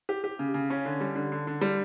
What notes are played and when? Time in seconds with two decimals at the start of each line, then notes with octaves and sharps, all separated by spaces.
0.09 G4
0.24 G4
0.39 C#3
0.54 C#3
0.70 C#4
0.85 D3
1.01 G3
1.15 D3
1.32 D3
1.47 D3
1.61 G3